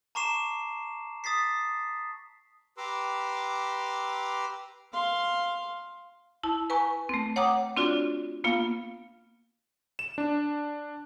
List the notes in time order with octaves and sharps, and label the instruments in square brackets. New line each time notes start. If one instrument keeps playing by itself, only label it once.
[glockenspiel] A5 A#5 C#6 D6 C7 E7
D#6 A6 B6 C7
[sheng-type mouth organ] G4 B4 A#5 C6 D6 E6
[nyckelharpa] F5 C6
[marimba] E4 A5
B4 G#5 A#5 C#6
A3 C4
C#5 F#5 G5 A#5 D6 D#6
C4 D4 F4 F#4 D5
A#3 B3 F4 F5
[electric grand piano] E7
D4